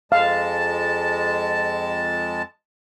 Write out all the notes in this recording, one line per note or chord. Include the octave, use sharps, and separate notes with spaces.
F2 G#3 F5 A5